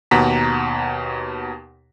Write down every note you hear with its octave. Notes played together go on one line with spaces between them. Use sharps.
D#2 B2 F#5 A#5 B6